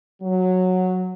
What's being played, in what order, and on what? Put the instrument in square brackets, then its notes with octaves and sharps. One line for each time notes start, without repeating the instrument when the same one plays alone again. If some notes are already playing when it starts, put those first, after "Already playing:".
[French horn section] F#3